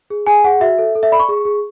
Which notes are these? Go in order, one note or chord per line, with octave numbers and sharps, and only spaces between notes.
G#4
G#4 G#5
G#4 F#5
F#4 E5
A4
A4
E5
D5 B5
C#6
G#4
G#4